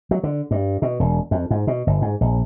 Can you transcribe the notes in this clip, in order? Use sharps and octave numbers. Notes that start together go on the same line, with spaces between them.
F#3
D3
G2
B2
E1
F2
G#2
B2
G1
G#2
A#1